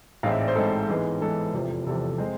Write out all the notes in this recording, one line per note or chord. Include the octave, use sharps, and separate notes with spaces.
A1 G#2 G#3 C4 F5
E5
D5
C5
A1 G#2 G#3 C4 A4
G#2 E3 G#3 B3
G#2 E3 G#3 B3 A4
F1 E2 C3 F3
F1 E2 C3 F3 A4
G#3 C4